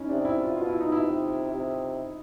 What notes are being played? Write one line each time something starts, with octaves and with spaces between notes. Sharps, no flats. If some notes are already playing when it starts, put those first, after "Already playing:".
Already playing: C#4 D#4 E4
C3 D4
E4
F4
B2 F4
E4
D#4
E4
C3
C3